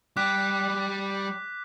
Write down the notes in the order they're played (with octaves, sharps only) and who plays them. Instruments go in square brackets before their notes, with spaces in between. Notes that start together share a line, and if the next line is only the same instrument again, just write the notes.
[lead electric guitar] G3 G5 [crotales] D6 F#6 B6